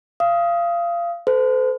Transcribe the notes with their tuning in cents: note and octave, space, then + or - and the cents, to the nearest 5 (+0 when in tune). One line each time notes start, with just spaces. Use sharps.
F5 -25 D#6 +20
A4 +0 C5 -40